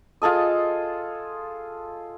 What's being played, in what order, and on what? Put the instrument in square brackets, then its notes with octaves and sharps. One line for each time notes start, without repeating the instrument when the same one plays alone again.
[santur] F4 G#4 A4 D#5